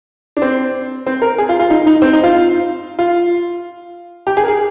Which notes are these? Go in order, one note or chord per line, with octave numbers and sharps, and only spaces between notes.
D4
C4
C4
A#4
G#4
F4
F4
D#4
D#4
C4
D#4
F4
F4
G4
G#4
A#4
G#4